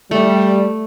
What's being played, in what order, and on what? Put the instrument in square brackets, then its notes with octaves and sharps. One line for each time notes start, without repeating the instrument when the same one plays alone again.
[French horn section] G3 [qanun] A3